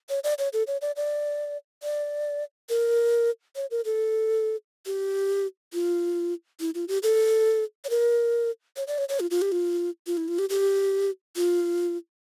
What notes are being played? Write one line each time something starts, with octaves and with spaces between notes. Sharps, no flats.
C#5
D5
C#5
A4
C#5
D5
D5
D5
A#4
C#5
A#4
A4
G4
F4
E4
F4
G4
A4
C#5
A#4
C#5
D5
C#5
C#5
F4
F4
G4
F4
F4
E4
F4
G4
G4
F4